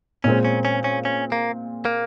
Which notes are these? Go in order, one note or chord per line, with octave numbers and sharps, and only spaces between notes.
A#2 G#3 C4 C#4
C#4
C#4
C#4
C#4
A#3
A#3